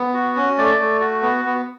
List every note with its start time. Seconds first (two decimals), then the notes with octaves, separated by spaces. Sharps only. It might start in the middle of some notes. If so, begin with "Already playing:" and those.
Already playing: B3
0.14 F#4
0.36 C#4
0.58 A3 D5
0.79 A3
1.00 F#4
1.22 B3
1.45 B3